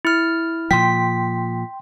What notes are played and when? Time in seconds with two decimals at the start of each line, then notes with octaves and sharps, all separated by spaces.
0.05 E4 F6
0.71 A#2 F3 G5 C6 B6